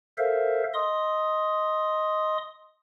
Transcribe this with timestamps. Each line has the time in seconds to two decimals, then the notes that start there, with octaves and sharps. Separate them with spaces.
0.18 A4 A#4 C5 E5 F5
0.74 D#5 C6 D#6